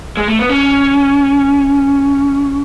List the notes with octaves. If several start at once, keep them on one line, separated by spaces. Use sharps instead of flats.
G#3
A3
B3
C#4